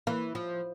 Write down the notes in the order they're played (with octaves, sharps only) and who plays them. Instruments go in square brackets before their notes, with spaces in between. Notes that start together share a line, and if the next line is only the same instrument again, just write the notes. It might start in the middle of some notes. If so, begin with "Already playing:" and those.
[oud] E3 [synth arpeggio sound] A#3
[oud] F3